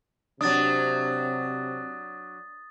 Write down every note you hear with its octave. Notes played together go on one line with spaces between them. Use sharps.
C3 F#3 D4 D#6 A6